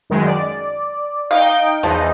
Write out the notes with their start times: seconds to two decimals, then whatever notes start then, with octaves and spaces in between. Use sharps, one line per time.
0.10 F#2 D#3 G#3
0.26 D5
1.31 D#4 F5 G5
1.83 E2 E3 F3 D#4